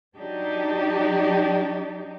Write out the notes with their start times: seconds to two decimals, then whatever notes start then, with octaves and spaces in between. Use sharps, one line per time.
0.16 F#3 D4 D#4 G4